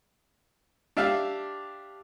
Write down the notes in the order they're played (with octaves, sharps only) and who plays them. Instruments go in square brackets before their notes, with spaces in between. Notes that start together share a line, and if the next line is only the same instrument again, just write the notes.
[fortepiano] D4 G4 E5 F5